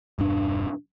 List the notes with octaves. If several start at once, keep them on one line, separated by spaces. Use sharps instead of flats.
E1 G2 D4